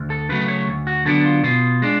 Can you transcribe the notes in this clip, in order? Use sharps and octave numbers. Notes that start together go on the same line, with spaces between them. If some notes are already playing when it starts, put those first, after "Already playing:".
Already playing: D2
A4
C#3 F#3 A3 B4
C#5
D2
F#4
D3 F#3 B3 D4 A4
F4
B2 F4
G#3 D4